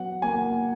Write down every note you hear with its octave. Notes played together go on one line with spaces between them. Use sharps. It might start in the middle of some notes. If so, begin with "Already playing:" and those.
Already playing: F#3 B3 F#5
A#3 G#5